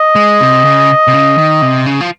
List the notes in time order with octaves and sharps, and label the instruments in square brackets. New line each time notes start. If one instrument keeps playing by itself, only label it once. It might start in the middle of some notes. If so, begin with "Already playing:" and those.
Already playing: [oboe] D#5
[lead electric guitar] G#3
C3
C#3
C3
C#3
D#3
C3
C#3
F3